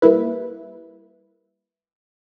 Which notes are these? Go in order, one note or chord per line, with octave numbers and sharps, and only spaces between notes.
G3 A#3 E4 B4